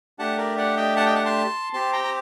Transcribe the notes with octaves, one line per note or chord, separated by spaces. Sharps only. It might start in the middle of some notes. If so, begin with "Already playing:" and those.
A3 D4 G4 F#5 A5
A#4 D5
D5 F#5
D#5 G5
F#5 A5
D#5 G5
F#5 A5
A5 C6
C4 G4 A5 C6
G5 A#5
A#5